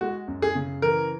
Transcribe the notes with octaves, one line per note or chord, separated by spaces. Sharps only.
G#3 F#4
F#2
G#4
C#3
E3 A#4